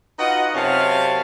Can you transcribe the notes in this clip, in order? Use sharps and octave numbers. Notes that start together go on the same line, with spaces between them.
D#4 F4 F#4 B4 D#5 F#5
F#2 C3 F#4 C#5 F5 A5